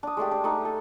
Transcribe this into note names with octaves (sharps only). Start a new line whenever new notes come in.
D4 D#6
G#3 A3 D4 G4
D4
A3 D#4
A4